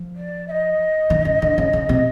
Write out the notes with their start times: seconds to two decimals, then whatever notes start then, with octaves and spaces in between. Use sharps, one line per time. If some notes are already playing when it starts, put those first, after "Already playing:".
Already playing: F3
0.16 D5
0.47 E5
0.51 D#5
1.10 D#3
1.25 C#3
1.42 D3
1.58 C#3
1.73 C#3
1.89 C3